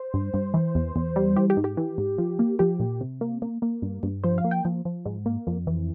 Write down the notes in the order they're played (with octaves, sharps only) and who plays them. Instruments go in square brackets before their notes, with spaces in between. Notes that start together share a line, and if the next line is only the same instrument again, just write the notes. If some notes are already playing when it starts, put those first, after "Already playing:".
Already playing: [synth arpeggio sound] C5
G2
G2
E3
E2
E2
G3
E3 G4
G4
G#2
G4
E3
G#2
F3
A#3
F3 G4
A#2
C3
A#3
A#3
A#3
G2
G2
F3 C5
F5
A#3
G5
F3
F3
G#2
A#3
F2
E3